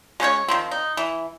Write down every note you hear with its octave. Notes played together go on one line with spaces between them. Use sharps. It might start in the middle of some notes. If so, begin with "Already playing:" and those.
G#3 C#4 C5 C#5
D#3 F3 C4
D#4
E3